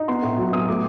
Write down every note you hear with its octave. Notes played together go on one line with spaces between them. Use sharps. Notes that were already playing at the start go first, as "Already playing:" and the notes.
Already playing: D#4
B3 C6
A2
F#3
B3 D#6
A3 D6